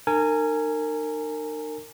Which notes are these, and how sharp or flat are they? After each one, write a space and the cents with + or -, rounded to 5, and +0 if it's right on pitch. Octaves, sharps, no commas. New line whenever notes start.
D#4 -40 A#4 -30 G#5 +0